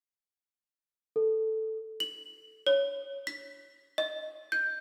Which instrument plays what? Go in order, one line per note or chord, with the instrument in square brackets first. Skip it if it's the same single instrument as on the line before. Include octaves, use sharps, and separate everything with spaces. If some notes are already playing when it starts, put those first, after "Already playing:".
[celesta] A4
[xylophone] F#7
C#5
B6
D#5
G6